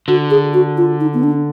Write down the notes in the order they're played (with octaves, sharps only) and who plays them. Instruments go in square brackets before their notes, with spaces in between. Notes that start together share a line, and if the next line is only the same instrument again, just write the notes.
[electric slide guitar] D3 [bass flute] F#4
[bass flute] G#4
F#4
F4
D#4
B3
D4